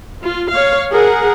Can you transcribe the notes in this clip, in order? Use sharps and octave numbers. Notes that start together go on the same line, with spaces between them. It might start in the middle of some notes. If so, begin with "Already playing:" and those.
F4
C#5 F5
G#4 A#4 F#5